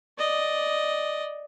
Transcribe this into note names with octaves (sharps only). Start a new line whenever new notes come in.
D5 D#5